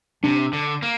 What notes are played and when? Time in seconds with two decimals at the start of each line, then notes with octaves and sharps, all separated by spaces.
0.24 C3 D4
0.53 D3
0.82 A#3